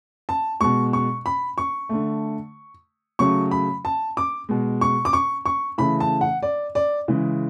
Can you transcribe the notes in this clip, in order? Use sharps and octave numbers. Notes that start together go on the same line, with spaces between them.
A5
B2 G#3 C#6
C#6
B5
C#6
D3 A3
C#3 F#3 A3 C#6
B5
A5
D6
B2 G#3
C#6
D6
C#6
C#6
C#3 E3 A3 B5
A5
F#5
D5
D5
C#3 E3 G#3